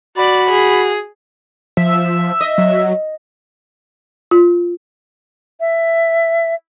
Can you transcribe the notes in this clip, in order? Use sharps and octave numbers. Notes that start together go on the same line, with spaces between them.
F#4 D5 B5
G#4
F3 E5
D#5
F#3
F4
E5